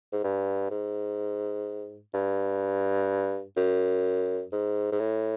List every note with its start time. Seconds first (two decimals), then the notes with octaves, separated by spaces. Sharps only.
0.12 G#2
0.24 G2
0.71 G#2
2.14 G2
3.57 F#2
4.52 G#2
4.92 G#2
5.00 A2